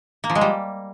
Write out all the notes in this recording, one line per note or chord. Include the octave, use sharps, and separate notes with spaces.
A#3
F3
G#3
G3